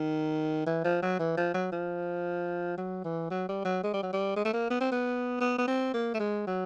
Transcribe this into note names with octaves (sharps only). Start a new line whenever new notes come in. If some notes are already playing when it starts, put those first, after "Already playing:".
Already playing: D#3
E3
F3
F#3
E3
F3
F#3
F3
F#3
E3
F#3
G3
F#3
G#3
G3
F#3
G3
G#3
A3
A#3
B3
C4
B3
B3
B3
C4
A#3
A3
G#3
F#3